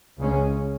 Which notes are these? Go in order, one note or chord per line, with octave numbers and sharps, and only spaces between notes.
C#2 C#3 G#3 C#4